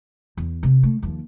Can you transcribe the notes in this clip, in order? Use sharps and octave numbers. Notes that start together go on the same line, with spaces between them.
E2
C3 C4
D3 A3
D#2 F3